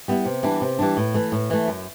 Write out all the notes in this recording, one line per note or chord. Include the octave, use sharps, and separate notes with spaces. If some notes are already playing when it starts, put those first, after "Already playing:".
G3 B3 E4
C3
E3 G3 D4
C3
E3 G3 D4
A2
E3 A3
A2
E3 A3
F#2